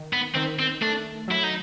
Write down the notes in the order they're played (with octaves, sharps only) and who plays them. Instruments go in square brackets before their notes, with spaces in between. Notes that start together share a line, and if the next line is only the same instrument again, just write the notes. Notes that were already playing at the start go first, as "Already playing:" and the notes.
Already playing: [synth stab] D#3
[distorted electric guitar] B3
[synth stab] D#3 [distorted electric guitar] C4
[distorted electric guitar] C4
[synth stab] A3 [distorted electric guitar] D4
[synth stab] F#3 [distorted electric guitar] E4
[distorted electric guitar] D#4